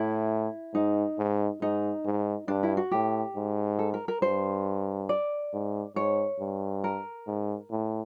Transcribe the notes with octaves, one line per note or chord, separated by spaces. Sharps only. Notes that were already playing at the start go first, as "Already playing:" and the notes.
Already playing: A2 E4
G#2 D#4
G#2
G#2 D#4
G#2
G2 D4
E4
F#4
A2 G4
G#2
A4
A#4
A#4
G2 C5
D5
G#2
G#2 C#5
G2
A#4
G#2
A2